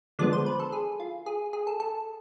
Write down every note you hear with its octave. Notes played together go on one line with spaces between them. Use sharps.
D3 F3 G#3 B3 D5
C5
B4
A4
G#4
F4
G#4
G#4
A4
A4